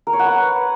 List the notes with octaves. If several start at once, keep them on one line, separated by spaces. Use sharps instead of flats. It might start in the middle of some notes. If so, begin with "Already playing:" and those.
A#4
C#5
F#5
B4